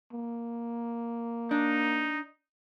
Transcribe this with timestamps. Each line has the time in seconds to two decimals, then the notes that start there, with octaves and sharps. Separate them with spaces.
0.13 A#3
1.51 D4 D#4